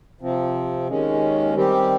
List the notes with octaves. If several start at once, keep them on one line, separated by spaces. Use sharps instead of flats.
C3 F3 C4
D#2 D#3 G#3 C#4
D#3 G3 C4 G4